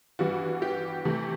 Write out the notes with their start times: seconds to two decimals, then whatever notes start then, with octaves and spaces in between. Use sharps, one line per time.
0.19 G2 E3 G3 B3 F#4
0.62 G4
1.05 C3 E3 A3